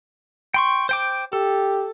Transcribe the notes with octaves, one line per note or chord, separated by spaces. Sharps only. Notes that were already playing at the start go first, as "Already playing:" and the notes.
G5 C6 C#6
C5 G5 D6
G4 A4